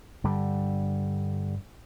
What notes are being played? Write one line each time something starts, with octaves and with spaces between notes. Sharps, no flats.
G2 D3 G3